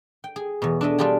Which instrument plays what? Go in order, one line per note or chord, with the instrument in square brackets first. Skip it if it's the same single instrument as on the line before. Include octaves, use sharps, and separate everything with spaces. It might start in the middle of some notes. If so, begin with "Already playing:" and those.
[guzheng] G5
G#4
E2 B2
D4 A4 D#5 E5
G3 D4 F4 G4 G#4